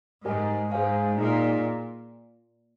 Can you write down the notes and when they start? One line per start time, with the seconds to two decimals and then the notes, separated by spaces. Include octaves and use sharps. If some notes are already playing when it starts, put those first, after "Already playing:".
0.24 G#2 G4 A#4 D#5 G#5
0.70 G#2 G#4 C5 F5 G#5
1.17 A#2 D#4 G#4 D#5